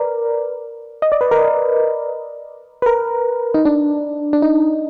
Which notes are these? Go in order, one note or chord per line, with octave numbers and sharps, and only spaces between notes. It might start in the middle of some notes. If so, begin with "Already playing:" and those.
Already playing: A#4 B4 D5
D#5
D5
B4
A#4
B4
A#4
D#4
D4
D4
D#4